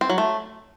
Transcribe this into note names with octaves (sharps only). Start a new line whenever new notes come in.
C4
F#3
A3